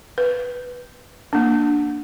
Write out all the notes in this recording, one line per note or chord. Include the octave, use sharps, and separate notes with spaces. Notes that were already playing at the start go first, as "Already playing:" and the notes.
B4
A#3 D4